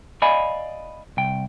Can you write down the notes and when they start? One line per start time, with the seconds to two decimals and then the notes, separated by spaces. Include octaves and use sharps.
0.22 D5 D#5 F5 G#5 B5
1.17 C2 G5